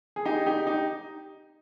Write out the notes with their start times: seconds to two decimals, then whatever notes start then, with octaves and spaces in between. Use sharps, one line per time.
0.16 G#4
0.25 D#4 G4
0.46 D#4 G4
0.66 D#4 G4